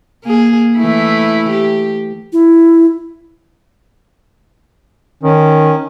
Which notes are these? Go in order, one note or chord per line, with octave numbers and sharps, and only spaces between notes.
A#3 G#4
E3 A3 E4
G4
E4
D#3 C#4